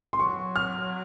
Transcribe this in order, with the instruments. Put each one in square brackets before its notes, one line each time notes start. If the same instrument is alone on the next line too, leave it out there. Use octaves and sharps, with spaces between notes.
[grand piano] C6
[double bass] F#3 [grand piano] C#6
[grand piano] F6